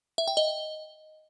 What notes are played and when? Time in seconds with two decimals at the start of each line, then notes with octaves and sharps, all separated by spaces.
0.18 E5
0.28 G5
0.37 D#5